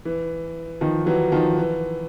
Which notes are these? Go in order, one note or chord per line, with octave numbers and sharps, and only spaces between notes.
E3
D#3 F3
E3 F#3
D#3 F3
E3